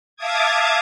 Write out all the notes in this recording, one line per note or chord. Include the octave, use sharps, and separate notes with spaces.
E5 F5 A5 D6 D#6 G#6